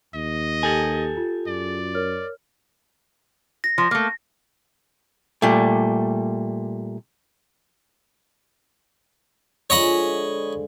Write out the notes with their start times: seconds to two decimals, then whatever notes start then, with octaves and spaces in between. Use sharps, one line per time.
0.15 D#2 D#5
0.63 G4 A4 G#5 A6
1.17 F4
1.47 F#2 D5
1.95 A#4 C#5 F6
3.64 A#6
3.78 F3
3.91 A3 A#3
5.42 A#2 G3 A3
9.70 D3 F3 G#3 C#5 D#5 B5